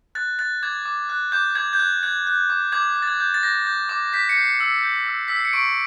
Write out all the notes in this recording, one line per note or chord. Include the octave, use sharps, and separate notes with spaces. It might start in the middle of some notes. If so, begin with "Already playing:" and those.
F#6 A6
F#6 A6
D6 G#6
D6
F#6
D6 G6
D6 G#6
G6
F#6 G#6
F#6 G#6
F#6
D6
D6 G#6
D6
A6
G#6
G6
A6
G6 A#6
G6
D6
G6 B6
C#7
G6 C7
E6 C#7
G6
E6
E6 B6
C7
C#7
C#6 D7